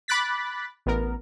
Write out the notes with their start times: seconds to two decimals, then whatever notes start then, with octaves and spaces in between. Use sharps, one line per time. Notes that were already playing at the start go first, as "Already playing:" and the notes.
0.08 B5 D6 F#6 A6 B6
0.86 A1 B3 A#4